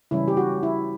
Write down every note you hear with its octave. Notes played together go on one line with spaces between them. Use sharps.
C#3 E3 G3 C#4 E4
G4
F#4
E4